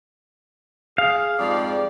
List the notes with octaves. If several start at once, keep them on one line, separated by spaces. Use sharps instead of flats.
G#4 F5
F2 G#2 G3 D5